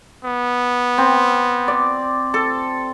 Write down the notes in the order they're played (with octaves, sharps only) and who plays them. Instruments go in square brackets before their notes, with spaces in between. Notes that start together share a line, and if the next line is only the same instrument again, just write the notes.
[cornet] B3
[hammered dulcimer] C4
D5
A4